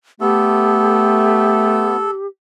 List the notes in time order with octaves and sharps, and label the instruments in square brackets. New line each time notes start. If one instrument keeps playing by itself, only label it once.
[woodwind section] A3 [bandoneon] B3 [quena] G4 [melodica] A4